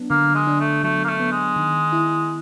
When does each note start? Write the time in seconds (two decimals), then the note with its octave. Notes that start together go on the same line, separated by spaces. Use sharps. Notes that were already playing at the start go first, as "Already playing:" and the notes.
Already playing: F#3 B3 D4
0.10 D3 A#3
0.35 G#3
0.47 D4
0.60 A3
0.83 F#3 A3
1.04 A#3
1.08 A3
1.20 B3
1.32 G#3
1.56 D#3
1.93 E4